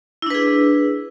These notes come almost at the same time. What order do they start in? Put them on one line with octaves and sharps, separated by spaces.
E4 D4 B4 G#4